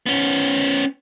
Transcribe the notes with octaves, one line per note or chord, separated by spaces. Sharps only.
B3 C#4